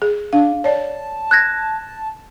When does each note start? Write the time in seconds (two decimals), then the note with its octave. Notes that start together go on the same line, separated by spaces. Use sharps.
0.02 G#4
0.33 D4 F5
0.64 C#5 D5 A5
1.31 F#6 G#6 A#6